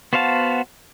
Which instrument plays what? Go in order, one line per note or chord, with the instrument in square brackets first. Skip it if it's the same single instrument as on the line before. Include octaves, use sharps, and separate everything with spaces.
[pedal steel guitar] B3 F#4 C5 F5 A5